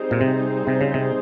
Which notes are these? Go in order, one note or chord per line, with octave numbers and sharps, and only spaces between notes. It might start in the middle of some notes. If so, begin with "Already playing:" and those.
Already playing: G3 C4 D#4 G#4 C5
A#2
C3
C3
C#3
C3